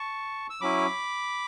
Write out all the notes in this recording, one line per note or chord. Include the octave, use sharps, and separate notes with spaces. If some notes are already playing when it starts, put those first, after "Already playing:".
Already playing: A5 C#6
E6
F#3 C#4 E4 B5 D6